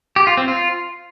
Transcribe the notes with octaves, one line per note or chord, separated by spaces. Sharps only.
G4
F4
C4
F4